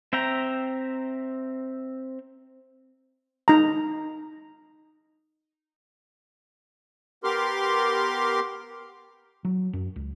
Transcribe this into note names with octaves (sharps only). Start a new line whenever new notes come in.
C4 E5 G5 A#5
D#4 A#5
B3 G4 A#4 C6 D6 F6
F#3
F#2
C#2